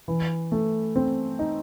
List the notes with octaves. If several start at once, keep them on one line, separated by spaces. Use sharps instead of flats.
E3
A3
C4
D#4